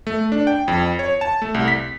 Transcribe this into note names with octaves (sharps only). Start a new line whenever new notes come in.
A3
D4
G5
F2
C#5
A5
A3
C2
B6